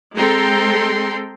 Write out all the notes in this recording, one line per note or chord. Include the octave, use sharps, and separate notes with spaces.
G#3 C4 A4 G5 A#5 C6